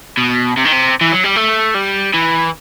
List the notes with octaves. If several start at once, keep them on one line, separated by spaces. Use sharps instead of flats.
B2
C3
D#3
C3
E3
F#3
G3
A3
G3
E3